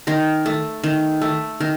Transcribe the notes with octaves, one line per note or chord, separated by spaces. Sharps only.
D#3 A#4
A3
D#3
A3
D#3 A#4